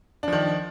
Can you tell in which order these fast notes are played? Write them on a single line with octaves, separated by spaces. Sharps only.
D4 F3 D#3